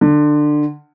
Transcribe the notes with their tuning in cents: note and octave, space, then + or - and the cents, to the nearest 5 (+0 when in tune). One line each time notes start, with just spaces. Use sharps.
D3 +20